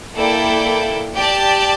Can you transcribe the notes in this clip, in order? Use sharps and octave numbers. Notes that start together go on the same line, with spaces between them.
A#3 E4 A4 D5 G5
G4 D5 A5